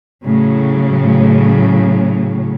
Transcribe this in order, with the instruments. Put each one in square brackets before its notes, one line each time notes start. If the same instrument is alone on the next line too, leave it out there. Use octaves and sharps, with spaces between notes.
[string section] A2 C#3 F#3